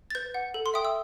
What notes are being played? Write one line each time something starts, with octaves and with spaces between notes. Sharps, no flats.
A6
B4 G6
F#5
A4
C6
E5 G5 D#6
E6